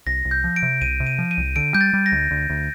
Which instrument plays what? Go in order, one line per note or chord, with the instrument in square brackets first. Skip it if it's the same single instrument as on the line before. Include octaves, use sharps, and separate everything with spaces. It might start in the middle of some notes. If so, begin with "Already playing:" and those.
[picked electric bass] C2 [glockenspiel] A#6
[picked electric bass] C2
[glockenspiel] G6
[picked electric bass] F3
[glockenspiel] D7
[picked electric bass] C3
[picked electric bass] C2 [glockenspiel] D#7
[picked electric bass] C3
[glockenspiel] D#7
[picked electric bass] F3
[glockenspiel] D#7
[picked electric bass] C2
[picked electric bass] D3 [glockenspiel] D7
[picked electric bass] G3 [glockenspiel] G6
[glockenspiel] A6
[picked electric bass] G3
[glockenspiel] A#6
[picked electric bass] D2
D2
D2